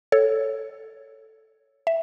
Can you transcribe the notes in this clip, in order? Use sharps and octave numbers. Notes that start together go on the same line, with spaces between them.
A4 C#5
E5